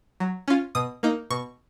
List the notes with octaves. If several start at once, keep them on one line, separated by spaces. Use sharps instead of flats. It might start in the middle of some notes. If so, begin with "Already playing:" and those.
F#3
C#4 F4
B2 D#6
A#3 D#4
B2 C#6